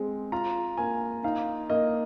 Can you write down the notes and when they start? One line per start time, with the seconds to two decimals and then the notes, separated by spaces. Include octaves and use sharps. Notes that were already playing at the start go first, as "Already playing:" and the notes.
Already playing: G#3 C4
0.32 F4 A#5
0.77 A#3 G#5
1.24 D#4 F5
1.70 A#3 D#5